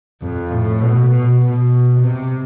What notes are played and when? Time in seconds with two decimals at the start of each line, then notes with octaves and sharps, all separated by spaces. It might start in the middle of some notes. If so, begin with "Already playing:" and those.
0.21 F2
0.51 A2
0.81 B2
1.11 B2
1.40 B2
2.00 C3